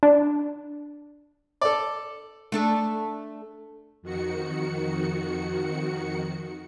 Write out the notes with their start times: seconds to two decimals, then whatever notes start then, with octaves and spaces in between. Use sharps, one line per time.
0.03 D4
1.61 A4 D5
2.52 A3 D4 A4
4.02 F2 D#3 F#4 C#7